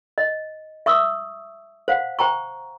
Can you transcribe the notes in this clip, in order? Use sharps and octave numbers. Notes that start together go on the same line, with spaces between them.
D#5
E5 C#6 D#6 E6
C5 F5 F#5
C5 G5 A#5 C#6